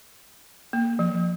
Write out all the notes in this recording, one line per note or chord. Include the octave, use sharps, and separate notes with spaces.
A#3
F3